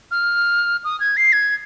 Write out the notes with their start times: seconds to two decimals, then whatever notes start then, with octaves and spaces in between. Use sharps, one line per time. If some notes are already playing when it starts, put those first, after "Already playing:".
0.11 F6
0.84 D#6
1.00 G#6
1.17 C7
1.33 G#6